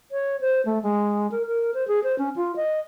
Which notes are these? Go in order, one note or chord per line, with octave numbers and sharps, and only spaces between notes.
C#5
C5
A3
G#3
A#4
A#4
C5
G#4
C5
C#4
F4
D#5